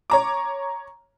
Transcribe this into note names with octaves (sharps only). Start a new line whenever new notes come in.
C#5 A#5 D6